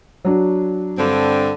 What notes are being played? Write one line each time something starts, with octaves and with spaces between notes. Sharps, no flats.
F#3 D4 F#4
G2 D3 C4